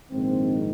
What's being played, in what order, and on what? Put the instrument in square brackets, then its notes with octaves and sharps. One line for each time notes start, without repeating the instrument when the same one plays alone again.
[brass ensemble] A#1 G#2 D#3 C4